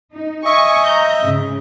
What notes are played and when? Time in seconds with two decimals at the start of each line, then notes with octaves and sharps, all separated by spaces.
0.14 D#4
0.45 D#5 E5 G#5 C#6
0.85 A#5 G6
1.22 G#2 C#3